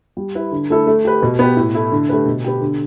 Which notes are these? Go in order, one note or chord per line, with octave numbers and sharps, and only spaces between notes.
G3
E4 B4
D3
A3 E4 A4
A3
G4 B4
B2
B3 G4 B4
A2
A3 E4
D3
A3 G4 B4
B2
B3 G4
D3